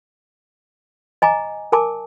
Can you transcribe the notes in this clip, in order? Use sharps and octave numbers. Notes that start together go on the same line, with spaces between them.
D#5 G#5 A#5 D6
A#4 G#5 A5 D6